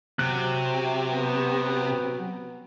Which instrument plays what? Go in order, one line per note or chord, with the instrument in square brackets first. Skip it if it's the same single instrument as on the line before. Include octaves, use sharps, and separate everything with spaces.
[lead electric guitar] C3 [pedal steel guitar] F#3 F#6
[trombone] B3